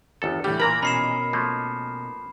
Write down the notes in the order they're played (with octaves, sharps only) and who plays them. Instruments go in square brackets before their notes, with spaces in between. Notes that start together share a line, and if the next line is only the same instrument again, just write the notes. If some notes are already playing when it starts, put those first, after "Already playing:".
[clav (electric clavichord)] G1 E2 A4
[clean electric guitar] A2 D3 E3 [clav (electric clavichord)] G3 [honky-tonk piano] G4
[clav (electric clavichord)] A#2 E3 A#3 [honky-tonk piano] A#4 [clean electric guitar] A#5 B5
[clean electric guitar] B2 C#4 D#4 [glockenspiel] B5 C7 E7
[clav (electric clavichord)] F3 A3 A#3